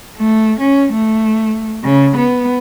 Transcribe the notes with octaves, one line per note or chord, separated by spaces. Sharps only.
A3
C#4
A3
C#3
B3